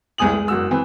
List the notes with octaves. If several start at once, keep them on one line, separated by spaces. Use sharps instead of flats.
F1 C2 G#3 G#5 D#6 F#7
G#3
F#1 F#4 E6
E3 C4 B4